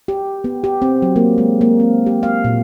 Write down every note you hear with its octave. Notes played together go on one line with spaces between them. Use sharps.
G4
B3
G4
C4
F#3
A#3
G#3
A#3
C4
G4
F5
A#2